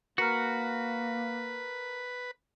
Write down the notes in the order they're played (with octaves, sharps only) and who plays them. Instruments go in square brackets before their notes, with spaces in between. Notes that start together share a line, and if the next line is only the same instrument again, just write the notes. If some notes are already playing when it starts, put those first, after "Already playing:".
[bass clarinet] A#3 [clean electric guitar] F#4 [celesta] A#4 A#5 F6 [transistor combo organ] B4